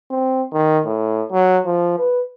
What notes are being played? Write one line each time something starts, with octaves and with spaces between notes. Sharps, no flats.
C4
D#3
A2
F#3
F3
B4